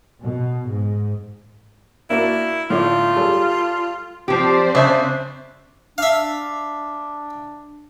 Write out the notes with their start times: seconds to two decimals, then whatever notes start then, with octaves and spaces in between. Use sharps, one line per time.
0.23 B2
0.67 G#2
2.10 A#3 D4 E4 F#4
2.70 A2 D3 E4 F4
3.16 G3 G#4 A4
4.28 F3 C4 G4 C5 D5
4.75 C#3 D4 E5
5.98 D4 E5 F5